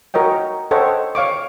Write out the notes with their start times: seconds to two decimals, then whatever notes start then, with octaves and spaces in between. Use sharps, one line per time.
0.14 F#4 A#4 C#5 D#5 G5
0.71 A4 C5 C#5 D#5 F#5 G5
1.15 C#5 F5 C#6 D6